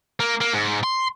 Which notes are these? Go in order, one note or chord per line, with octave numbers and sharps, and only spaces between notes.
A#3
A#3
G#2
C6